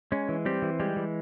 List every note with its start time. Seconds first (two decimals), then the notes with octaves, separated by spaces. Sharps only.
0.12 G#3 C#4
0.29 E3
0.46 G3 C4 G4
0.62 E3
0.80 G3 G#3 G4
0.97 E3